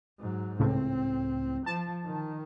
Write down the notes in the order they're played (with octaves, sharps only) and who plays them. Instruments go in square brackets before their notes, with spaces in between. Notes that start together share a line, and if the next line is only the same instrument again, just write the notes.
[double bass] G#2 F#3
[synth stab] C#2 A2 [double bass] C4
[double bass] F3 [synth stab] A5
[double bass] D#3